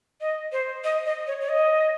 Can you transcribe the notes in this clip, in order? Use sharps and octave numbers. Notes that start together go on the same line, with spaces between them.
D#5
C5
D#5
D#5
C#5
C#5
D#5